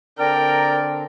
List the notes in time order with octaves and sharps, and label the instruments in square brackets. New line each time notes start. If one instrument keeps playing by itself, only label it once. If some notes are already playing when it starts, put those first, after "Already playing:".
[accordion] D3 C4 D4 [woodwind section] A#4 [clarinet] D5 [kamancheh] G5